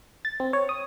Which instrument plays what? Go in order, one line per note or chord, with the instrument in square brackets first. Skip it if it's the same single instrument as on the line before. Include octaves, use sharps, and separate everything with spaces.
[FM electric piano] A6
C4
C#5
D#6